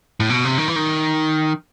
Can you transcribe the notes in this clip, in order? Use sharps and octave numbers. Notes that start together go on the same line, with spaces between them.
A2
B2
C3
D#3
E3
D#3